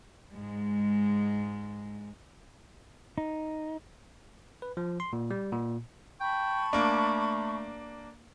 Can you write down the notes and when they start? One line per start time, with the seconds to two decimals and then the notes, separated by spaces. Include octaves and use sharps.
0.33 G#2 G#3
3.18 D#4
4.62 B4
4.77 F3
5.00 C6
5.13 A#2
5.31 G3
5.52 A#2
6.20 G5 A5 B5 C#6
6.73 A3 A#3 D4